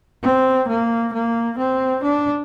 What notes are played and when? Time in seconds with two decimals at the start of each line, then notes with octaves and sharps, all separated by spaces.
0.23 C4
0.68 A#3
1.13 A#3
1.58 C4
2.03 D4